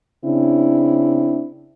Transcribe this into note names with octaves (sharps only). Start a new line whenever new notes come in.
C#3 C4 D4 E4